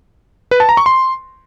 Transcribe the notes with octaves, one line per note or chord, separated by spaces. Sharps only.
B4
A5
A#5
C#6
C6